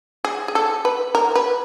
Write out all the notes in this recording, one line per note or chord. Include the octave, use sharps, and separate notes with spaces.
G#4
G#4
A4
B4
A#4
B4